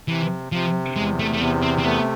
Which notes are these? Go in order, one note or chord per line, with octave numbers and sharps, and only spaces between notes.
C3 E3
C3 F3
E2 G#3
A3
A3
C3 B3
C4
C4
A3 B3